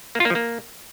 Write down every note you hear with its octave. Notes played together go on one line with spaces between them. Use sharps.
A#3
F4
A#3
F3
A#3